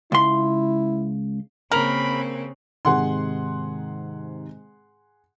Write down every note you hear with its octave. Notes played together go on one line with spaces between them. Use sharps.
C#2 E4 C6
C#3 A#3 C4 A#4 B5 F7 F#7
G#2 C3 D#3 G#4 F#5 C6